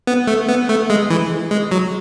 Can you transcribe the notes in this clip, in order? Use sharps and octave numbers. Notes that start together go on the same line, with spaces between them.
B3
A3
B3
A3
G#3
E3
G#3
F#3